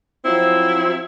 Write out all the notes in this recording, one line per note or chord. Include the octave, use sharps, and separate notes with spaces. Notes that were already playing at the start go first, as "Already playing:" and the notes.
F3 F#3 C4 E4